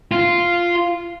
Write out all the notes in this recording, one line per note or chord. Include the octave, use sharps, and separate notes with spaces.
F4